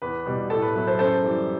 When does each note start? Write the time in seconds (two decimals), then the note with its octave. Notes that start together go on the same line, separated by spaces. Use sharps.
0.02 E2 B4
0.26 B2 G3
0.50 A2 A4
0.62 B4
0.75 F#3 B3 E4 B4
0.87 A4 C5
0.99 F#2 A4 C5
1.24 E3 G3